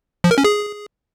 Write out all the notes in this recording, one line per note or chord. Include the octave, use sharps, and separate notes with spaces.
F3
A#4
C#4
G#4